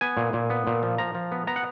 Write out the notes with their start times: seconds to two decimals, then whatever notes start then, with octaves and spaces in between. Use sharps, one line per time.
0.01 B3 G#5
0.17 A#2
0.33 A#2
0.50 B3
0.67 A#2
0.83 F3
0.98 F3 A#5
1.15 F3
1.32 B3
1.47 B3 A#5
1.56 F#5